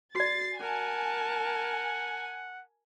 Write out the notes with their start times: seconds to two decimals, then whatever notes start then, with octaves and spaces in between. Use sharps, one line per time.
0.15 F#4 D5 A6 C7
0.60 A#4 F#5 G#5 A5